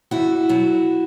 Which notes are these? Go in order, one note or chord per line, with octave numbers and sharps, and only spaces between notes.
E2 E4 F#4
B2 F#3